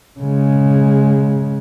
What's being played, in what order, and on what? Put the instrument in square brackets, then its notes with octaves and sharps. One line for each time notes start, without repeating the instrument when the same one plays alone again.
[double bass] C#3 G#3